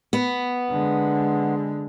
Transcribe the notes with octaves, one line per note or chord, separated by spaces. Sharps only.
B3
D3 G#3